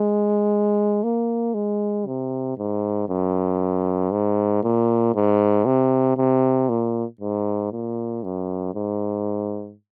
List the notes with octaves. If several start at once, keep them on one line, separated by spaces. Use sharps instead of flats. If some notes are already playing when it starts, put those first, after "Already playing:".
Already playing: G#3
A#3
G#3
C3
G#2
F#2
G#2
A#2
G#2
C3
C3
A#2
G#2
A#2
F#2
G#2